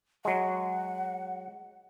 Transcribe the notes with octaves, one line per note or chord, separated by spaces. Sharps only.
F#3 G#3 F#5